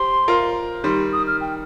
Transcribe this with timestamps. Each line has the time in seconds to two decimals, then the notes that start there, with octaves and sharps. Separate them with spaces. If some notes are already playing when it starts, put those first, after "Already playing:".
Already playing: G4 C5 C6
0.28 F4 A#4
0.84 D#3 G3 C6
1.13 D#6
1.27 F6
1.41 G5